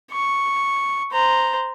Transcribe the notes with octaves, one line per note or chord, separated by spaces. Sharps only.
C#6
C5 A#5